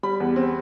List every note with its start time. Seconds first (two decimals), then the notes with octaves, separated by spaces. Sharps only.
0.03 G3 B5
0.20 E2
0.36 C4